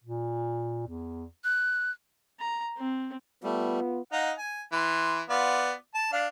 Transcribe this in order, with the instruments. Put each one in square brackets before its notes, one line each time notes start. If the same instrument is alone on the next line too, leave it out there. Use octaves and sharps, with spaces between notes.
[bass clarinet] A#2
E2
[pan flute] F#6
[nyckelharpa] A#5
C4
[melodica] G3 A3 [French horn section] B3 F4
[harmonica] D#4 F5 F#5
G#5
E3 C6
B3 F4 D5
A5
D4 F5